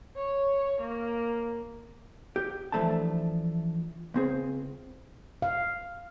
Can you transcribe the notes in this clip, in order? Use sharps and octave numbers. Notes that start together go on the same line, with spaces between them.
C#5
A#3
G4
E3 F3 A3 D4 A5
C#2 C4 G#4
F5